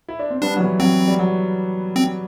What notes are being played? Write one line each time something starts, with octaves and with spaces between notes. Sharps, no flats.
E4
D4
C4
G3 B3 D4
F#3
E3
F#3 C4
G3
F#3
C4